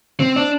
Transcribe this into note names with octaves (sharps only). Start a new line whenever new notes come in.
C4
D4